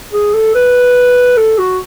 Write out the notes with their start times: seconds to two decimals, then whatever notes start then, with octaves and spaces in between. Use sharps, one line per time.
0.13 G#4
0.34 A4
0.55 B4
1.37 A4
1.58 F#4